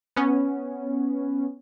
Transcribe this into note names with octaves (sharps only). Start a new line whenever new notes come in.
B3 C#4